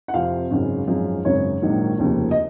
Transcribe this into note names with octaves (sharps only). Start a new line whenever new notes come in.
F#5
F2 C3 F3 F5
G#1 F#2 C#3 G#3
G#1 F#2 F3 G#3
G#1 F#2 C#3 C#5
A#1 G#2 D#3 F#3 A#3
F1 D#2 C#3 F3 A#3
D#5